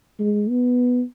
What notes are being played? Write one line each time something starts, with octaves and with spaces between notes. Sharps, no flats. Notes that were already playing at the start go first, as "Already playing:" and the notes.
G#3
B3